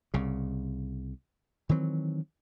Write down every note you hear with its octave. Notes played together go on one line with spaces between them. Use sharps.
C2 C#3
D#3 E3 F#3 C4